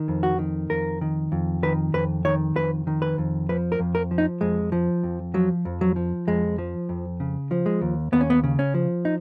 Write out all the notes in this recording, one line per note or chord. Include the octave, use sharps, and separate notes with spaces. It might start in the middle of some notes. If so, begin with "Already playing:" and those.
Already playing: D#3
F2
F#4
D#3
F2 A#4
D#3
F2
D#3 B4
F2 B4
D#3 C#5
F2 B4
D#3
B4
F2
F3 B4
A#4
F2
A#4
F3
D#4
F2 G#3
F3
F2
F3 F#3
F2
F#3
F3
F2 G#3
F3
F2
C#3
F3
G#3
D#2
D#2 B3
C#4
B3
C#3
C#4
F3
D#4